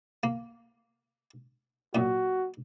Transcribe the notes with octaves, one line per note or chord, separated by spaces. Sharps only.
A#3
F#2 A#2 F#4